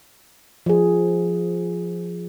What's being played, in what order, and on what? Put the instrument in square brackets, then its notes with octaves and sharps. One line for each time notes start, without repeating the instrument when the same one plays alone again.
[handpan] F3 G#4